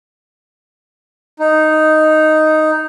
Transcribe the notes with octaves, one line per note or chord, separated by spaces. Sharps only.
D#4